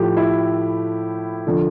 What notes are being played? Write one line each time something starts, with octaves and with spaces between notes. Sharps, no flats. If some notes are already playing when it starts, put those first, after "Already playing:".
Already playing: A2 F3 G4
E4
D3 F3